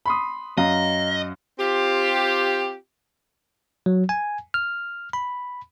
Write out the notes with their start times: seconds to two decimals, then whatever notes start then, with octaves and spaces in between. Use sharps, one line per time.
0.06 B5 C6 D#6
0.58 F#2 D#5 F5 A#5
1.59 C4 F4 G4
3.86 F#3
4.09 G#5
4.54 F6
5.13 B5